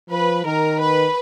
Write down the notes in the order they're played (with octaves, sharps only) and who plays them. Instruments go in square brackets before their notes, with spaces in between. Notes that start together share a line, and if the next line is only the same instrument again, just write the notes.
[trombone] F3 [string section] B4
[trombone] D#3 [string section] A#4
[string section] B4